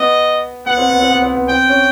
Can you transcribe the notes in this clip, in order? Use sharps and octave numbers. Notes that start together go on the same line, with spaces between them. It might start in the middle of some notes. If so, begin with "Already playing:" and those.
Already playing: B3 D#5
B3 F#5
C4
B3
C4
B3
C4
B3
C4 G5
C#4